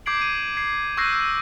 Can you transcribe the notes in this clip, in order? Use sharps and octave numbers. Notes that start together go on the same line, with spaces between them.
D6 G6 G#6 C7 D7 F#7
D#7
F#7
G#6 C7
C#6 E6 F#6 G6 A#6 C7
E6